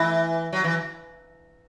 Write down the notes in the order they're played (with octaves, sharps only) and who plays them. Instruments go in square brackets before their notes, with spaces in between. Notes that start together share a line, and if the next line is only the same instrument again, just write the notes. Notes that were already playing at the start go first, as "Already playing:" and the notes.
Already playing: [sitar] E3 [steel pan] E4
[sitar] F#3
E3